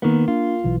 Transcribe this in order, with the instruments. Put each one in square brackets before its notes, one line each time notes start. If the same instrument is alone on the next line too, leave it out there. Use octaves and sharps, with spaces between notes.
[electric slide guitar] D#3 B3 [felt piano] A#3
[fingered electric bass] D4 [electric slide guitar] F4
[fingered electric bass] B1 E3